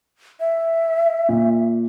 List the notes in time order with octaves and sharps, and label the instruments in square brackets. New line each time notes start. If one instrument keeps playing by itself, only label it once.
[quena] E5
[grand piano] A#2